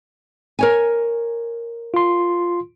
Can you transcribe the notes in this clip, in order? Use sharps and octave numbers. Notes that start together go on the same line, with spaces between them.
A#4 C#5 G#5
F4 C6